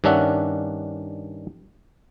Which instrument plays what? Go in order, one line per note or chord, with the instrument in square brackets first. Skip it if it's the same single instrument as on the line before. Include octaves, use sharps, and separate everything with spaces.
[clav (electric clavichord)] G2 D#3 C#4 D4 E5 F#5